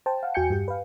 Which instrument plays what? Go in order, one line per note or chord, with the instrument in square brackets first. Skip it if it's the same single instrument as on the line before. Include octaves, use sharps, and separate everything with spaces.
[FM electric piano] C5 G5 A5
F5 F#5
E2 F#4 G5 G#5 G6 C#7
G2 G4
B4 F5